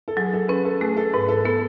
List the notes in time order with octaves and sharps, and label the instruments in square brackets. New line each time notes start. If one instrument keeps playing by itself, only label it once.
[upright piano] A4
[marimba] F#3 [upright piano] G#4
[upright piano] A4
[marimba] C#4 [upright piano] B4
[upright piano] A4
[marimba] A3 [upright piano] G#4
[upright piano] A4
[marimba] G#2 [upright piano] B4
[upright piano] A4
[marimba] B3 [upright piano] A4